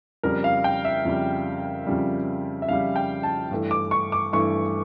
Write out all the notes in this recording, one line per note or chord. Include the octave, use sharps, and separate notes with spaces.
F2 C#3 G3 A#4
F5
G5
E5
F2 C#3 G3
F2 C#3 G3
E5
F2 C#3 G3 F5
G5
A5
G2 E3 A3
D6
C#6
D6
G2 E3 A3 C#6